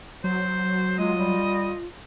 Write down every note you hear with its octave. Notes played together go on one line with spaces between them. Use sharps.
F#3 C5
G#3 F4 D#5
G3